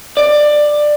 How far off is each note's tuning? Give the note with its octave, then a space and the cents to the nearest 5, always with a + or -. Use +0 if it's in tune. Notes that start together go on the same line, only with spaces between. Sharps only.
D5 +15